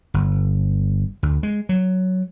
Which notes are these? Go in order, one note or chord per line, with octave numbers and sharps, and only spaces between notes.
G1
D2
G#3
F#3